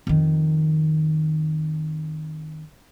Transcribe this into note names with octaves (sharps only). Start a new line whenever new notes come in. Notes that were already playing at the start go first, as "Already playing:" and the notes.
F2 D#3